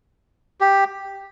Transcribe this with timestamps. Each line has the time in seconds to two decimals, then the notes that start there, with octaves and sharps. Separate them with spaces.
0.61 G4